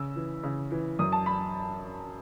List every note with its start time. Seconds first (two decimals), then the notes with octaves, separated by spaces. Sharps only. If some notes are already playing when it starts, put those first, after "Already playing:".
Already playing: C#3 E6
0.16 E3
0.43 C#3
0.71 E3
0.99 F#2 D#6
1.12 A5
1.26 B5